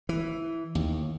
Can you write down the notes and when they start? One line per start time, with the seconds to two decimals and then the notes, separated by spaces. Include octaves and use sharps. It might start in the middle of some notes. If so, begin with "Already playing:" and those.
0.09 E3
0.75 D#2